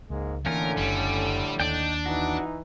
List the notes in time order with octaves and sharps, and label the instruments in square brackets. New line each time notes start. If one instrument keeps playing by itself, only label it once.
[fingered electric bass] C#2 [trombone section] G#2 G#3 A#3
[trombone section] A2 D3 [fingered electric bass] E3 A#3 [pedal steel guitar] A3 C#4 F4 [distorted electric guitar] A#4
[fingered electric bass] F#1 [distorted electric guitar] G3
[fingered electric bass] D#2 [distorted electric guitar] D4 [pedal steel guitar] D#4 D5 G5
[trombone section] E3 D#4 [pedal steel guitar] F#4